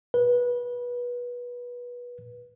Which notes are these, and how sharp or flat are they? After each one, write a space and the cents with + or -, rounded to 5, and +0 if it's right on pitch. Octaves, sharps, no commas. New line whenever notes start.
B4 -25